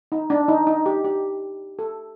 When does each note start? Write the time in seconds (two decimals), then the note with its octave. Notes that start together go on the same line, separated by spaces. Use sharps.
0.12 D#4
0.30 D4
0.48 D#4
0.67 D#4
0.86 G4
1.04 G4
1.79 A4